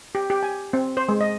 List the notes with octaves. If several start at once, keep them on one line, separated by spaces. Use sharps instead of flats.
G4
G4
G#5
C4
C5
G#3
D#5